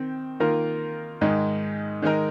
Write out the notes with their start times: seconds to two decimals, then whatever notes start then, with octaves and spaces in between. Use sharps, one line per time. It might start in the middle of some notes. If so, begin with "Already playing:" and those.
Already playing: D#3 C4
0.40 D#3 A#3 F4 A#4
1.21 G#2 D#3 G#3 D#4
2.02 D#3 G#3 D#4 A#4